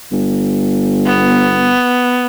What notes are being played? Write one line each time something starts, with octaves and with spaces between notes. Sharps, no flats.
G1
B3